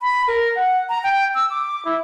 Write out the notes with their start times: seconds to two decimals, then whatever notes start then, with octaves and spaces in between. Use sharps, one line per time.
0.01 B5
0.28 A#4
0.56 F#5
0.89 A#5
1.04 G5
1.35 E6
1.50 D6
1.85 E4